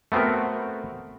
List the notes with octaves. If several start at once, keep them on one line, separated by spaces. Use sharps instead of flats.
A3 B3 C4 F#4 A#4